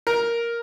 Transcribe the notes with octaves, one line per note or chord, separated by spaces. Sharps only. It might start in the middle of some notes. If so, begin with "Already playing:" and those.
A#4